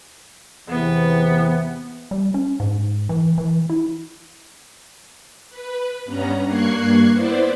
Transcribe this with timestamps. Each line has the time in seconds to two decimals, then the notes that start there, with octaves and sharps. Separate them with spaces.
0.69 E2 C3 E3 B3
2.11 G3
2.34 C#4
2.60 G#2
3.09 E3
3.38 E3
3.70 E4
5.50 B4
6.05 G2 B3 C#4 A#5
6.46 G2 A#3 C#6 F#6 G#6 C7
7.12 B3 E4 B4 C5 D5